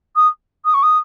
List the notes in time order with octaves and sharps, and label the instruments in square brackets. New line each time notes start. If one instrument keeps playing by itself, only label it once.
[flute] D#6
D#6
C#6
D#6